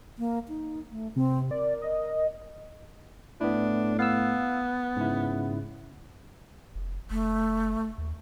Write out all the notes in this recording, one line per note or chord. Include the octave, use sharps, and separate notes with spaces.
A#3
D#4
A3
C3 C4
A#4 D5
D#5
A2 B3 D4 E4
B3 F5 E6
G#2 C#3 E4
F1
F1 A3
D#2